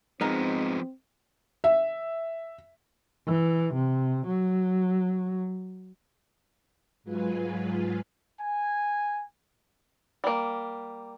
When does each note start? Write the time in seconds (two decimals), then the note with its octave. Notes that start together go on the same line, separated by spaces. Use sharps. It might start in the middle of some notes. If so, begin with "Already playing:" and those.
0.21 F3 G#3 B3 C4 D#4 A#4
1.64 E5
3.26 E3
3.74 C3
4.26 F#3
7.03 G#2 F#3 G#3 F4 B4 G#5
8.40 G#5
10.24 G3 A#3